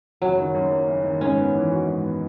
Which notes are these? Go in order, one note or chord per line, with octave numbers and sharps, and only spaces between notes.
F#1 F#3
D#3
F#2
A#3
F#1
D#3
G#2 C#4
B3
E3
F#4
G#2
B3